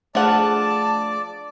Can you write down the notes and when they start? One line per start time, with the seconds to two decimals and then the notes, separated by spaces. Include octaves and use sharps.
0.15 F3 A3 D4 G#4 D5 F#5 A5